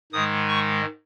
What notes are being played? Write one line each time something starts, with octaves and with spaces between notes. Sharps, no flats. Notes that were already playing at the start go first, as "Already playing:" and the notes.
G#2 D#3 G#3 D#6
C#6